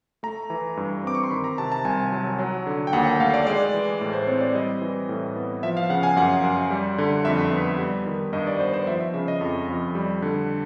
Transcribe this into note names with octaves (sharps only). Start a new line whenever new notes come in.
A3 A#5
E3
G2
C4 D6
C#6
C6
D#3 B5
A#5
C3 A5
A5
C2 G#5
F#3
F#3
D3
G5
D#2 F#5
F#5
A3 F5
D5
G#3 D5
E3
A2
C5
C4 C#5
D5
G3 D#5
E3
A2
B3
F3 E5
F5
C#3 F#5
G#5
F#2 F#5
F#2
G3
D3
F2 E5
B3
G3
D#3
G2 D#5
D5
B3 C5
C5
F3 E5
E5
C#3 E5
D#5
F2
F2
G3
D3